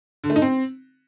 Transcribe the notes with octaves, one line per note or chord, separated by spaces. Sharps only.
D3
A3
D#4
C4